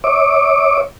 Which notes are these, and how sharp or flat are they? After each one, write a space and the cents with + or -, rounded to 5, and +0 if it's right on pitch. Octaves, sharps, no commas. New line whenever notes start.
C#5 +0 E5 -45 D6 +10